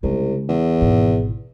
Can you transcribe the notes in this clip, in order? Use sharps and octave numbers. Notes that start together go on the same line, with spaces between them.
C2 C#3 G#3
E2
G#1 B2